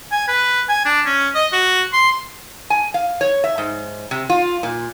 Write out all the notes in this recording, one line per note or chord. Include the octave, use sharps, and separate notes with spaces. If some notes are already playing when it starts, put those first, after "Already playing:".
G#5
B4
G#5
D4
C#4
D#5
F#4
C6
G#5
F5
C#5
E5
G#2
C3
F4
A#2